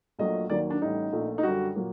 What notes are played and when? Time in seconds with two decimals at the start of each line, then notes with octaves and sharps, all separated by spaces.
0.19 A#1 A#2 F#3 A3 D#5
0.50 D#2 D#3 F#3 A#3 D5
0.70 D4
0.81 A1 A2 G3 D#4
1.12 A#1 A#2 A3
1.38 D#4
1.43 F#2 D3 G3 F#4
1.75 A#2 F#3 A#3